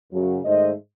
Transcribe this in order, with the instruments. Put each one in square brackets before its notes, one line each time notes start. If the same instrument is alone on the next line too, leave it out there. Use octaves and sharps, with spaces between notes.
[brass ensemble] F#2 C#3 F#3
G#2 D#3 A3 C5 D#5